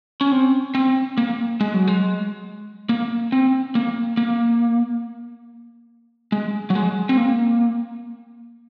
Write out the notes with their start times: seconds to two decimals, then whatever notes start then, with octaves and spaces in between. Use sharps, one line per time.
0.21 C#4
0.32 C4
0.75 C4
1.18 A#3
1.61 G#3
1.74 F#3
1.88 G#3
2.89 A#3
3.32 C4
3.75 A#3
4.17 A#3
6.32 G#3
6.70 F#3
6.75 G#3
7.09 C4
7.17 A#3